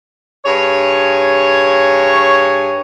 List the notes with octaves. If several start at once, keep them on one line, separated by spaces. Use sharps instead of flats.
G2 G#4 C#5